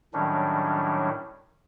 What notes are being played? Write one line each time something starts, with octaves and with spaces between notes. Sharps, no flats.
A2 D#3 F#3 G3 C#4 D4